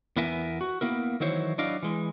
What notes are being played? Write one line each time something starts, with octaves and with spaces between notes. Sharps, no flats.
E2 B3 E4 A#4 E5 G#5
F#4
A#3 B3 E4 A#4
D#3 E3 F#3 E4 C5 C#5
F#3 D4 E4 D5 D#5 F5
E3 G#3